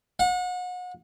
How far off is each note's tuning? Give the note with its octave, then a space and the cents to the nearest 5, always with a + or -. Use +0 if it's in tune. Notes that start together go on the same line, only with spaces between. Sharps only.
F#5 -35